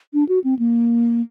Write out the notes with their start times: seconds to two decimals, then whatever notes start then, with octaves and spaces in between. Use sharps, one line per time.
0.13 D4
0.28 F#4
0.44 C4
0.59 A#3